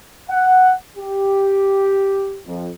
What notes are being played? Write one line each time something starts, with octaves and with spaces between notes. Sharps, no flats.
F#5
G4
F2